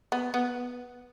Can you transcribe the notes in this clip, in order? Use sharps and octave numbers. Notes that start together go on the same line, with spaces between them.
B3
B3